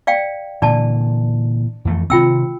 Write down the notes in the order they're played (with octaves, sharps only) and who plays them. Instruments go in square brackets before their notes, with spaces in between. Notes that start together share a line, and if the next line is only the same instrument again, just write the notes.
[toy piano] D5 F5 G5
[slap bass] A#2 D3 E3 [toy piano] D4 D5 A5
[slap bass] F2 E3 A3
[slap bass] C3 D#3 C4 [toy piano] F4 G5 E6